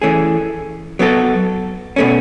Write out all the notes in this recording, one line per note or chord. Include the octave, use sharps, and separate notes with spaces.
E3 A3 C#4 G#4
F#3 B3 F#4 A4
B2 A3 C#4